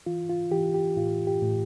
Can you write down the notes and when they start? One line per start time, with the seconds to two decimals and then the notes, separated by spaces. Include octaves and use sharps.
0.06 E3 F4
0.29 F4
0.52 E3 G4
0.74 G4
0.97 A2 F4
1.27 G4
1.43 A2